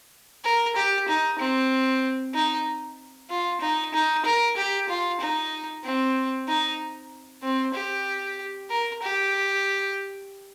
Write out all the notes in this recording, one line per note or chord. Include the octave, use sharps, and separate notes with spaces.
A#4
G4
D#4
C4
D#4
F4
D#4
D#4
A#4
G4
F4
D#4
C4
D#4
C4
G4
A#4
G4